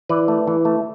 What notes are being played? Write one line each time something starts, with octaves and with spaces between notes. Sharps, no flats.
E3 B4 D5
A3
E3
A3